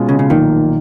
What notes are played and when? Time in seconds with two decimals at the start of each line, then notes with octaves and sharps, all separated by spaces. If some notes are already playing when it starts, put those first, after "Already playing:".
Already playing: B2 G#3 C#4 F4
0.09 C#3
0.19 C#3
0.29 B1 A#2 D#3 F3 A#3